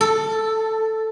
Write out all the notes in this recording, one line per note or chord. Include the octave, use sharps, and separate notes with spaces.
A4